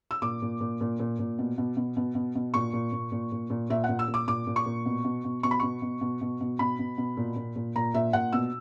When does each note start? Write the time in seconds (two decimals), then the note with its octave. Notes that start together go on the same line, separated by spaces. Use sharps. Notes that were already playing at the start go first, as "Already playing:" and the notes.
0.11 E6
0.22 A#2 D6
0.42 A#2
0.60 A#2
0.81 A#2
1.00 A#2
1.19 A#2
1.39 B2
1.58 B2
1.77 B2
1.97 B2
2.15 B2
2.35 B2
2.54 A#2 C#6
2.73 A#2
2.92 A#2
3.12 A#2
3.32 A#2
3.50 A#2
3.70 A#2 E5
3.84 F#5
3.89 A#2
3.99 E6
4.08 A#2
4.14 D6
4.27 A#2 D6
4.47 A#2
4.56 C#6
4.66 A#2
4.86 B2
5.04 B2
5.24 B2
5.43 B2 C#6
5.51 B5
5.60 B2 C#6
5.82 B2
6.01 B2
6.21 B2
6.41 B2
6.59 B2 B5
6.79 B2
6.98 B2
7.17 A#2
7.36 A#2
7.56 A#2
7.75 A#2 A#5
7.94 A#2 E5
8.13 A#2 F#5
8.33 B2 E6